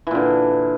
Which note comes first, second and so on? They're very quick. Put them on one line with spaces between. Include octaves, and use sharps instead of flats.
E3 A#2 D3